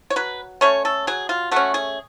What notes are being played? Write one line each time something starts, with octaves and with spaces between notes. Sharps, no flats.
C#5
F#3 B4
A3 C#4 C#5
A4
F#3 G#4
F4
A3 C#4 F#4
G#4